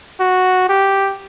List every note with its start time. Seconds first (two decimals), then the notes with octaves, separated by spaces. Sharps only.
0.20 F#4
0.69 G4